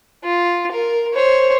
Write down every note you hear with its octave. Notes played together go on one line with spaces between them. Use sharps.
F4
A#4
C5 C#5